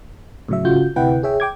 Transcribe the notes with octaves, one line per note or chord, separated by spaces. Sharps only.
A2 C#3 F#3 E5
G#1 C#3 F4 F#4 G6
D2 C3 E4 B4 F#5 G5
G#4 C#5 E5 G5
G5 D6 G#6